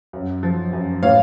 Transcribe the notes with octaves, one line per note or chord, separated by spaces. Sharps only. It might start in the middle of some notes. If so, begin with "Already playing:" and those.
F#2
F3
F#2
A2 C#5 F5